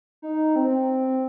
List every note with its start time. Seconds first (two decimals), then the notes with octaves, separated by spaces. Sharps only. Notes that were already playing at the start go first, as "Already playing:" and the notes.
0.22 D#4
0.56 C4